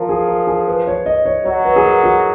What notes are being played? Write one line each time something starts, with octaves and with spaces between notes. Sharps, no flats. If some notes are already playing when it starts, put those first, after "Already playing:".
Already playing: F3 A#4
G#4
A#4
G#4
B4
C#5
D#5
C#5
F#3 C#5
B4
G#4
A#4
F#4